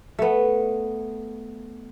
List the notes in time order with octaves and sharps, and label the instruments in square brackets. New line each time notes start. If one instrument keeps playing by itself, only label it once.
[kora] A3 B3